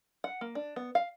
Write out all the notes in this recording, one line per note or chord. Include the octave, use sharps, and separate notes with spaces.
F#5
A#3
D4
B3
F5